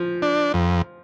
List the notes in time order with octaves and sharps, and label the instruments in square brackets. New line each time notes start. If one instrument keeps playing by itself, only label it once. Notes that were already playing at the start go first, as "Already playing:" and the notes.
Already playing: [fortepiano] F3
[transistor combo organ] D4
F2